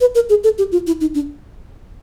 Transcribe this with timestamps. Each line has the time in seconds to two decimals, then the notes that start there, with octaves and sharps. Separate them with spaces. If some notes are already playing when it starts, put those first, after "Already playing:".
0.01 B4
0.15 A#4
0.29 G#4
0.44 A4
0.58 G4
0.72 F4
0.87 E4
1.01 D#4
1.15 D4